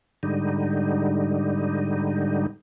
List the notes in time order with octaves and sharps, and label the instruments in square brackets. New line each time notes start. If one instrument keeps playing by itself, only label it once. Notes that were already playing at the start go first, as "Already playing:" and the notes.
[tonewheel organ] G#2 D3 G3 D#4